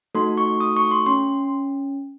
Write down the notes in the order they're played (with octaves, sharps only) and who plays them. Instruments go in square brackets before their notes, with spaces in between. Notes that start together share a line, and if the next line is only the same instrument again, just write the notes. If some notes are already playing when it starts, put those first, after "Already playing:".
[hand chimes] A3 D#4 F#4 A4 C6
C#6
D#6
C#6
C6
C#4 C6